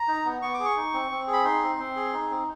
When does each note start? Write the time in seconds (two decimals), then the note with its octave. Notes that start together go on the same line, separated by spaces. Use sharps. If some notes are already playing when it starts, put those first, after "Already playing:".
Already playing: A#5
0.08 D#4
0.25 B3
0.42 B3 C#6
0.54 D6
0.59 G#4
0.65 C#6
0.77 D#4
0.93 C4
1.11 C4
1.27 G#4
1.33 B5
1.44 D#4 C6
1.62 C4
1.79 C4
1.96 G#4
2.13 D#4
2.30 C4